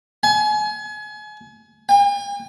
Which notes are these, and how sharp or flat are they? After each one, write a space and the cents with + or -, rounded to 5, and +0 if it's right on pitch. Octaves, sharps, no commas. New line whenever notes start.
G#5 +35
G#5 -45